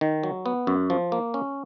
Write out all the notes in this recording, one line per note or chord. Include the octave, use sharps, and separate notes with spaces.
D#3
F#3
B3
F#2
F3
A#3
C#4